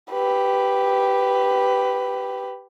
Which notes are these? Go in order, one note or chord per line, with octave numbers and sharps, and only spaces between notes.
G4 B4